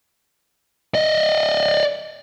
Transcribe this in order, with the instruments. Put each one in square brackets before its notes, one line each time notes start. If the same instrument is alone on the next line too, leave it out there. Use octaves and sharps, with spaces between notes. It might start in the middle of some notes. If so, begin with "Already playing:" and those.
[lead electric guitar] D5 D#5